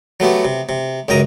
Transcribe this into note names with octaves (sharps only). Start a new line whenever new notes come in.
F#3 A3 B3 G4
C3
C3
C#2 F#2 G5 A#5 D#6